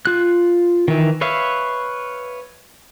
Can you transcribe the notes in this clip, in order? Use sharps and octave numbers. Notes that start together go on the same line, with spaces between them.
F4 F#6
D#3 E3
B4 C#5 E5 F5